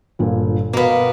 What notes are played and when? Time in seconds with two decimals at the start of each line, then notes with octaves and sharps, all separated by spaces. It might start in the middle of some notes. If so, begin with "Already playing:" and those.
0.19 G1 A#2
0.73 B2 A#3 B3